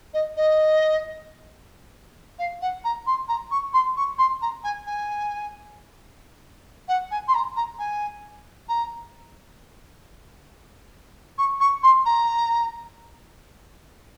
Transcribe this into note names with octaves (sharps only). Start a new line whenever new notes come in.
D#5
D#5
F5
F#5
A#5
C6
A#5
C#6
C6
C#6
C6
A#5
G#5
G#5
F#5
G#5
C6
A#5
A#5
G#5
A#5
C#6
C#6
C6
A#5